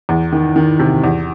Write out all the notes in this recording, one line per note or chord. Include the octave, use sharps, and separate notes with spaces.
E2
D#3
D#3
C3
E2